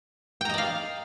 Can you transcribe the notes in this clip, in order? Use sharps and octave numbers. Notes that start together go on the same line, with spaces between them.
D5 D#5 F5 G5 A#5